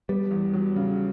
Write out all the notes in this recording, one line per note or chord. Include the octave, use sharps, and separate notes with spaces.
G3 B3
E2
F#3
C#3